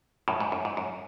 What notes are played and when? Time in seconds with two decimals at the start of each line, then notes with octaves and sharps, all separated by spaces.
0.28 F#2 A2
0.40 G#2
0.52 F#2
0.65 G#2
0.77 F#2